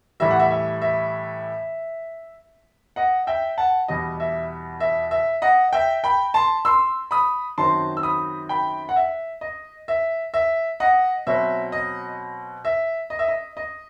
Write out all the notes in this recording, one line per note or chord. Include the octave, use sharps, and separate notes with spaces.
A2 E3 G3 E5
F#5
E5
E5
E5
D#5 F#5
E5 G5
F#5 A5
E2 B2 G3 D#5
E5
E5
E5
D#5 F#5
E5 G5
G5 B5
A5 C6
C6 E6
B5 D#6
F#2 D#3 F#3 C4 A5 C6
E6
B5 D#6
G5 B5
F#5
E5
D#5
E5
E5
D#5 F#5
B2 F#3 C4 E5
D#5
E5
D#5
E5
D#5
D#5